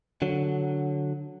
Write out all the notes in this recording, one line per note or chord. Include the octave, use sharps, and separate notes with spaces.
D3 F#3